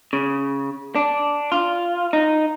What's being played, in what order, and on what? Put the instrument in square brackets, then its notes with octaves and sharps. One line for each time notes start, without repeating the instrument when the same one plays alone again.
[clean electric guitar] C#3
D4
F4
D#4